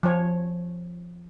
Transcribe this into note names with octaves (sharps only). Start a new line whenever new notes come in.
F3 C#5